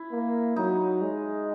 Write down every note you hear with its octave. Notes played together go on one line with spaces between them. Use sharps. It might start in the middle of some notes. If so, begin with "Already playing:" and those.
Already playing: E4
A#3
F#3 D#4
G#3